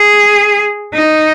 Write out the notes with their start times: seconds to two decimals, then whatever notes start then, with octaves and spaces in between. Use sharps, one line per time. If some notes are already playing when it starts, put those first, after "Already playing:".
Already playing: G#4
0.94 D#4